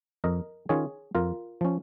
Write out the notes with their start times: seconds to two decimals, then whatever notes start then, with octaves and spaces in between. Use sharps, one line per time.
0.24 F2 A#4 D#5
0.69 D#3 C#4 F4 G#4 C#5
1.15 F2 F4 A#4
1.61 F3 C#4